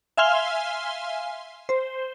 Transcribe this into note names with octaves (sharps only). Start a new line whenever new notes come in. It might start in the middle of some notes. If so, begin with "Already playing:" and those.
E5 F5 G#5 C6 F6 G7
C5